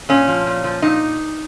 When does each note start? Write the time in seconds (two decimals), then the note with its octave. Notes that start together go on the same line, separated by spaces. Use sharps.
0.09 A#2 C#4
0.28 F3
0.46 A#2
0.64 F3
0.82 A#2 D#4